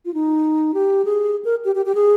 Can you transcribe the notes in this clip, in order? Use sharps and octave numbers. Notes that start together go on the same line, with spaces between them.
F4
D#4
G4
G#4
A#4
G4
G4
G4
G#4